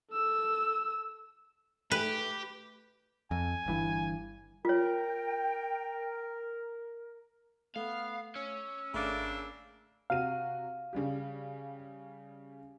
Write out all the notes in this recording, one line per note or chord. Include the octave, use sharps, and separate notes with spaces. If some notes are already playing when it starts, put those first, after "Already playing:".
A4 E6
A3 G4 B4
F2 G#5
G1 G2 E3
F4 A#4 C#5 G5
A3 B3 F5
C#4 E6
G#1 C#3 A3 A#3 D4 E5
C3 F#4 F5 D#7
C#3 G3 G4